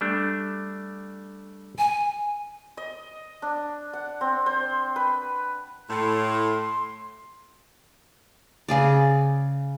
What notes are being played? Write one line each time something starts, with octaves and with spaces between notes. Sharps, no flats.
G3 A3 D4
G#5
D#5
D4
F#5
C4
C5
B4
A2 C6
C6
C#3 G#4 D5